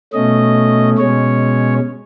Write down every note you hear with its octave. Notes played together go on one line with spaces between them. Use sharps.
B2 A3 C#4 D#5
B2 G#3 C#4 C#5